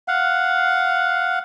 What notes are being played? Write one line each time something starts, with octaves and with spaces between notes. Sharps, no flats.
F5 F#5